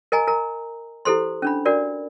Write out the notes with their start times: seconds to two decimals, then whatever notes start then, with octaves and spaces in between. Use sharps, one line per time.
0.12 A#4 D#5 G#5 A#5
0.27 A#4 A#5
1.05 E4 G4 A4 C5 C6
1.42 C#4 D4 B5
1.65 D4 F#4 A#4 D5